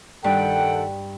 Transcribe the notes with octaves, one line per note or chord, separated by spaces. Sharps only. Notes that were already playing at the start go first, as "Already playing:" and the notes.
G2 D#3 A4 F#5 G5